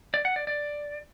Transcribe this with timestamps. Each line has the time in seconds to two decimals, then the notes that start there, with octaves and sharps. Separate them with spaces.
0.14 D5
0.25 F#5
0.36 D5
0.47 D5